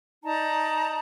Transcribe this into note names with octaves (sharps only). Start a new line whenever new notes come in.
D#4 D5 A5 A#5